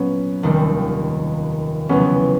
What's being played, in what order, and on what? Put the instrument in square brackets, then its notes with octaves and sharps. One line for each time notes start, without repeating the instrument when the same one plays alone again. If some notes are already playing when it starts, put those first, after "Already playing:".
Already playing: [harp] A#2 F#3 A#3 [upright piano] B3 C#4
[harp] F1 D#2 D#3 G3 A#3
[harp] F1 E2 C#3 F#3 [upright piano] B3 C#4